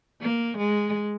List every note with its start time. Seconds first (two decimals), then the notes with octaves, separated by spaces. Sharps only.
0.21 A#3
0.58 G#3